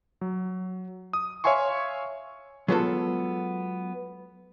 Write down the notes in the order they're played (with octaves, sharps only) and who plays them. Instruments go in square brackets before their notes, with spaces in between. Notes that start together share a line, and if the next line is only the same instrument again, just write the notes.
[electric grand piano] F#3
D#6
C#5 E5 F5 G#5 C6 C#6
[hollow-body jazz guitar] F#3 G#3 B3 F4 F#4 A4